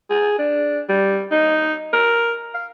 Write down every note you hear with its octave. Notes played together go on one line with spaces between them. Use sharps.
G#4
D4
G3
D#4
A#4
F5